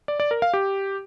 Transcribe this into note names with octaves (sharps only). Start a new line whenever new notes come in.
D5
D5
A#4
F5
G4